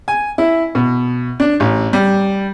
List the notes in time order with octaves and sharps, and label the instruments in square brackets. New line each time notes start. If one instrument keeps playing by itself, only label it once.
[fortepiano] G#5
E4
B2
D4
A1
G3